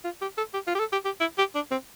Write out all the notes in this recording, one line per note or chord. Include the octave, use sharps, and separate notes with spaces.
F4
G4
A4
G4
F4
G4
A4
G4
G4
E4
G4
D4
C4